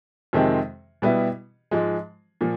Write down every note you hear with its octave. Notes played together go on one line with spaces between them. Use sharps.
F2 C3 D#3 G#3 C4
B2 G3 B3 E4
G#2 F3 G#3
A#2 F3